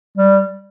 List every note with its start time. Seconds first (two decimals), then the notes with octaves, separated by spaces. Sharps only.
0.17 G3